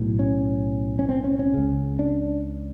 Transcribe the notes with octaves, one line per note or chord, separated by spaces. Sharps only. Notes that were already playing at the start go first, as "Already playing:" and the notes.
Already playing: B1 A2
C#4
C#4
C4
C#4
C#4
C#2 C#3
D4